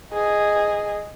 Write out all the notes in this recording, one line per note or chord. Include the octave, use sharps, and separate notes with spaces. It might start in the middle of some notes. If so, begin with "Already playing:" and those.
G#4 D#5